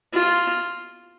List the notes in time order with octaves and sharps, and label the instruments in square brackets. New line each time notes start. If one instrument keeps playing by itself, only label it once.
[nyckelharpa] F4